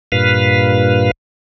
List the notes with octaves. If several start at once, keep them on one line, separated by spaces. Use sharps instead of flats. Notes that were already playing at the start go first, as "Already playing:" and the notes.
G2 A#2 B4 F5